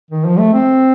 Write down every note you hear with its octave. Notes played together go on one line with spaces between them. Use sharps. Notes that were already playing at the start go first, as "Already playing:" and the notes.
D#3
F3
A3
C4